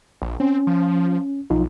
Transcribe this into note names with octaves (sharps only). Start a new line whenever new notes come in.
A#1
C4 C#4
F3
B1 F3 D#4 F4